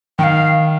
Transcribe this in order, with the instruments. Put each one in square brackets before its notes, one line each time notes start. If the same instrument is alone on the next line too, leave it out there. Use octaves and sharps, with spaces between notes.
[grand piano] D#3 [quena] F5 G5